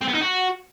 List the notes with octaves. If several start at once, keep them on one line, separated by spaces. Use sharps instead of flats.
C4
B3
D#4
F#4